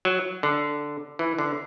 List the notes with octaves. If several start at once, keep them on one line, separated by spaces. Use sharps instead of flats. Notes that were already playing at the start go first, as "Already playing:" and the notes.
F#3
D3
E3
D3